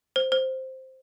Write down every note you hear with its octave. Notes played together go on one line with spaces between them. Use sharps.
C5
C5